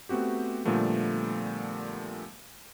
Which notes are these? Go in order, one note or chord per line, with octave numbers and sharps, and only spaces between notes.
A3 B3 C4 F#4 G4
A#2 D3 F3 G3 A3 B3